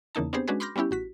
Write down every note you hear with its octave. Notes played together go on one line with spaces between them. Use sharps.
E2 C#3 A#3 D#4 A5
B3 C4 D4 G4 G#4 C5
G#3 C#4 D4 F#4 G#4 B4
B5 C6 D6 F6 G6 A#6
G3 B3 C#4 E4 G4
A1 F#4 B6